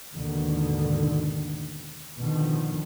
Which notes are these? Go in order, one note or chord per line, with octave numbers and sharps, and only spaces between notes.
D#2 G#2 B2 D3 D#3
B2 D3 D#3 F3